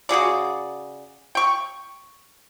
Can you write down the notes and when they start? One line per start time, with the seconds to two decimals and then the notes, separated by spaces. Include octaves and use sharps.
0.09 C#3 F#4 G#4 D5
1.35 G5 C#6